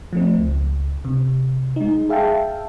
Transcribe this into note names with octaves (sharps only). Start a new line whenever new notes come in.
F3 A3 C4
C#2
C3
G#3 D#4
G#4 E5 F5 G5 A5